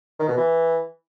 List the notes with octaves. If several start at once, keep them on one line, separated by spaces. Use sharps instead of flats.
D#3
B2
E3